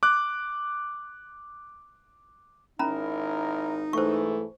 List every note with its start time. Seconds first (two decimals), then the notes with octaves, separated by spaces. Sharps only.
0.03 D6 F#6
2.79 G#1 C#4 D#4 E4 A#4 A#5 B5
3.93 G#2 E3 A3 C5 C#6